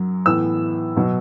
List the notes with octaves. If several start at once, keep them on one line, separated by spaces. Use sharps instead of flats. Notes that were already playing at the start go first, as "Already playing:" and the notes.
Already playing: F#2 F#3
A2 E3 B3 E6
B2 F#3